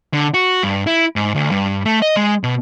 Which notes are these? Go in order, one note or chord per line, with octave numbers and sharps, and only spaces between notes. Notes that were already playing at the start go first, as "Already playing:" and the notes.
D3
F#4
G2
E4
G#2
D2
G2
A3
D#5
G#3
B2